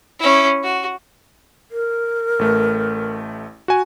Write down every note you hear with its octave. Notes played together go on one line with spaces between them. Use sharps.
C#4 E4
F#4
A#4
A1 A3
F#4 G#5